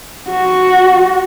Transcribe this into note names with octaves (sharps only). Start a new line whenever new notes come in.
F#4